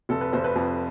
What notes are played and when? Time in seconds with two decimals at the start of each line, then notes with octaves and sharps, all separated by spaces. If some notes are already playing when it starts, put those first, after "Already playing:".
0.09 F1 A4
0.21 B4
0.33 F1 C5
0.44 B4
0.56 F2